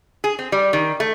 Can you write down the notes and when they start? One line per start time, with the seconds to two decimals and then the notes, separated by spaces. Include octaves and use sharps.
0.24 G#4
0.39 C4
0.52 G3
0.73 D#3
1.00 A3